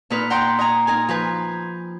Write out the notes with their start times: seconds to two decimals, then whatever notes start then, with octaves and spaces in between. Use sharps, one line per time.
0.10 A#2 D#4 B4 F6
0.30 F#5 G5 A#5 C6
0.59 D#5 G#5 A#5
0.87 D#4 A#4 G#5
1.09 F3 B4 G#5